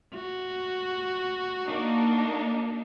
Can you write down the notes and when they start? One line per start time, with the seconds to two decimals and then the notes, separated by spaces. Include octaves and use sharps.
0.14 F#4
1.66 A#3 D4 D#4